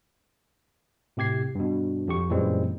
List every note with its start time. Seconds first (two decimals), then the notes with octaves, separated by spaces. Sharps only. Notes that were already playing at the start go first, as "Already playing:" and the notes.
1.17 A2 C3 G4 G#6 C7
1.55 G2 B2
2.08 F2 G4 C#6
2.30 F#2 A#2 E3 G3 G#3 C4